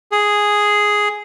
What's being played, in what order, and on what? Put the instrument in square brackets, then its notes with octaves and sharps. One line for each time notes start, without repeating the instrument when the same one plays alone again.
[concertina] G#4